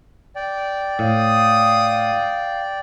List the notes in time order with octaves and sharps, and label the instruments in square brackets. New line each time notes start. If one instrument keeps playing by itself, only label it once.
[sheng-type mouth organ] D5 G5
[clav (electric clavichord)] A2 [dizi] F5 [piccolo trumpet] D#6